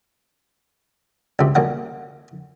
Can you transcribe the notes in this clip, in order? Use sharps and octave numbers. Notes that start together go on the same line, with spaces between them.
C#2 C3
B1 A#3 F#5